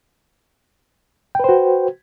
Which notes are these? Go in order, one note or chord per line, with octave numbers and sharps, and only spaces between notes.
F#4 B4 C5 G5